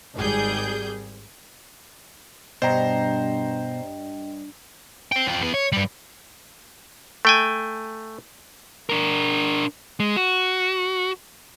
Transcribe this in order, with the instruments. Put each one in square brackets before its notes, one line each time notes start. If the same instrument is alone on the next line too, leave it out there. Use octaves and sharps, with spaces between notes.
[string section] G#1 G3 G#4 G6
[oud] G2 [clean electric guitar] B2 [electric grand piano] C5 A#5 [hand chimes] D#5 G5
[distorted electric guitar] C5 G5
F3 G5
E3 B3
C#5
G2 G3
[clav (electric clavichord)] A3 G5 G#5
[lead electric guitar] D4 A#4
G#3
F#4